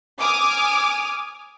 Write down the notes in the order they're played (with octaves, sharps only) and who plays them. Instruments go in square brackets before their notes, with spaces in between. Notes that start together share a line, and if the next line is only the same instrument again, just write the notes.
[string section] G#5 D6 D#6 F6